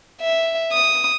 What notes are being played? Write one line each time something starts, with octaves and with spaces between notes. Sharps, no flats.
E5
D#6